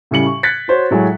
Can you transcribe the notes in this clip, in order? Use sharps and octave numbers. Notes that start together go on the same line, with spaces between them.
A2 C#3 G3 C#7 F#7
C#6
F#6 G#6 A6 B6 C#7
F#4 C5 C#5
A2 F#3 G#3